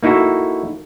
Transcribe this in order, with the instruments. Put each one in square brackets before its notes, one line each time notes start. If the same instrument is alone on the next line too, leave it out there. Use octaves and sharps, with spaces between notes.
[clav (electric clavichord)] A#3 D#4 E4 F#4 A4